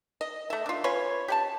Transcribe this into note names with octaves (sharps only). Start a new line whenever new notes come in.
D#5
A3 E5
D4 F4
C#4 F4 B4 C#5
G4 F#5 A5